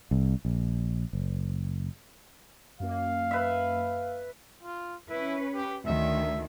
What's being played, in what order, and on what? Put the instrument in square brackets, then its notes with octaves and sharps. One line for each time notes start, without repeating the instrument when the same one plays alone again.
[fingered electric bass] C2
A#1
F#1
[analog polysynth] F#2 A#3 [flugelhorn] F5
[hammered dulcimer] B4 E5
[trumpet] F4
[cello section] C#4 B4 [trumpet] E4
[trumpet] G4
[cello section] D2 D#3 [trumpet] E5